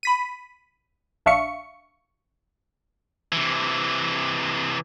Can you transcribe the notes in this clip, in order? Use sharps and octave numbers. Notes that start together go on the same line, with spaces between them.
B5 B6 D#7
A#1 D4 E5 F5 C#6 C#7
C3 E3